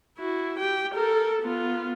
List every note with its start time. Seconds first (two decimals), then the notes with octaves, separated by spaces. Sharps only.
0.18 E4 F#4
0.59 G4 G5
0.95 A4 A#4
1.42 B3 F4